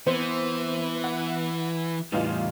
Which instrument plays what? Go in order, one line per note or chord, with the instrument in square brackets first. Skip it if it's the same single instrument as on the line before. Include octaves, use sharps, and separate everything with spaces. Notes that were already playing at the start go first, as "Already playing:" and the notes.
[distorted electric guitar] E3 [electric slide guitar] B3 [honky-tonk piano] C4 C5
[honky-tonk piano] F#5
[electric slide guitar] E2 A2 G3 [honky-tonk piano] E3 D#4 F4